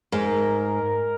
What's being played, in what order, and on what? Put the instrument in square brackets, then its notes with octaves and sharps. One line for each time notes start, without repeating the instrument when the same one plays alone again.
[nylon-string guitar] G#2 [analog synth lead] A#4